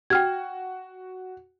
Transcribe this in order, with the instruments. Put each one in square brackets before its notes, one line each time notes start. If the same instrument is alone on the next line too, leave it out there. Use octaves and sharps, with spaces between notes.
[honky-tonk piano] F#4 [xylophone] G5 F6 G#6